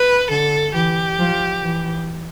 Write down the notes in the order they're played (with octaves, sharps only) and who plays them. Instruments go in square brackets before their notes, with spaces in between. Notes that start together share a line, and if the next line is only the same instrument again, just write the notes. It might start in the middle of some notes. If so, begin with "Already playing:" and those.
Already playing: [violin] B4
[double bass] D3 [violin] A4
[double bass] E3 [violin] G4
[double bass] F3
E3